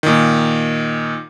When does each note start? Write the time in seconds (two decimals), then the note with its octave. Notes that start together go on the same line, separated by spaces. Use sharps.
0.03 A#2 D#3